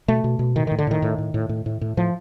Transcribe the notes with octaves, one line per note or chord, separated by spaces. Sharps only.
B2 A3
B2
B2
A2 D#3
A2 D#3
D3
A2 D#3
A2
A2
A2
A2
A2
A2
A2 F3